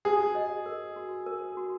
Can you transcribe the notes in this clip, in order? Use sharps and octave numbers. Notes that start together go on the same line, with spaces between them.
F#4 G#4
D#5
A#4
F#4
A#4
F#4